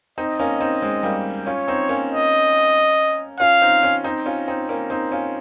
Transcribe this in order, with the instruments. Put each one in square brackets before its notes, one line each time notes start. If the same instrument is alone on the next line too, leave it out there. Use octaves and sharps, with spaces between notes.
[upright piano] C4 D#4 [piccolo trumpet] D#5
[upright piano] A#3 C#4
C4 D#4
G#3 C4
G3 A#3
[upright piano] C#4 F4 [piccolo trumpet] C#5
[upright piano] C4 D#4
A#3 C#4
[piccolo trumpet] D#5
[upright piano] C#4 F4 [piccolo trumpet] F5
[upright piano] C4 D#4
C#4 F4
C4 D#4
C#4 F4
C4 D#4
A#3 C#4
C4 D#4
C#4 F4